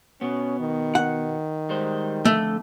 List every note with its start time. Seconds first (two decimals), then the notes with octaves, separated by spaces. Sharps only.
0.21 B2 B3 C#4
0.60 D#3
0.95 F#5
1.69 G3 G#3 C5
2.25 F2 D3 A3